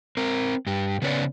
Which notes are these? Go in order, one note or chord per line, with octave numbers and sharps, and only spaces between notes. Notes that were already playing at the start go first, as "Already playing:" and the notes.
C4 A#4
G2 G4
C#3 B3 C#4 B4 D5 F#5